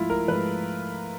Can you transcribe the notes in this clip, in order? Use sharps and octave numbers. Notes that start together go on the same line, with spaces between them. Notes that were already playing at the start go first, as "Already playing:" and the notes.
Already playing: G#2 F3 A3 E4 F4
A#4
G#2 F3 A3 B4